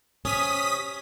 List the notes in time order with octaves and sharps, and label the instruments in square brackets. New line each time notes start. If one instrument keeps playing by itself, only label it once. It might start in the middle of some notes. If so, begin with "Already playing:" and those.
[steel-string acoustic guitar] C3 C#4 [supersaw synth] D#6 B6